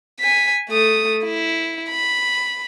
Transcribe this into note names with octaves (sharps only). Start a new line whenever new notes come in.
G#5 B6
A3 D#6
E4
B5